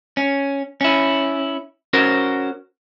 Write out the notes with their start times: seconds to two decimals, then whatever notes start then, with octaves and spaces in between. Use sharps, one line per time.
0.17 C#4
0.81 C#4 E4
1.93 C#4 F#4 A#4 C5